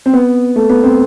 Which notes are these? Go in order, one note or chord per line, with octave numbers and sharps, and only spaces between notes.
C4
B3
A3
B3
C4